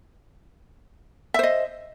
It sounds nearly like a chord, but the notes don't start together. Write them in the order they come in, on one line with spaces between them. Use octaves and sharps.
E5 C5 D#5